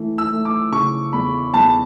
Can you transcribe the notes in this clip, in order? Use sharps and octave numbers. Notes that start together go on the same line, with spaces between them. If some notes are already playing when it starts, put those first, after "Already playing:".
Already playing: E3 A3
E6
A3
D6
C#3 C#6
E2 B5
E2 A5